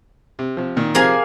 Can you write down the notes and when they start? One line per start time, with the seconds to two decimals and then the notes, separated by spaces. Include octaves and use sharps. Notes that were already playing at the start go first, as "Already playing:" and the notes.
0.39 C3
0.57 C3 F3
0.76 A#2 D#3
0.95 C3 F3 A#3 G#4 F5 G#5